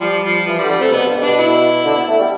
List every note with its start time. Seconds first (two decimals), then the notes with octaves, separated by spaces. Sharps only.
0.01 F3 G3
0.24 F3
0.47 E3 F3
0.58 G3
0.62 D3
0.70 G3
0.78 C3 A3
0.93 B2 B3
1.05 G2
1.16 G2
1.24 B2 D4
1.39 E4
1.85 D3
1.97 B3
2.08 A3
2.19 G3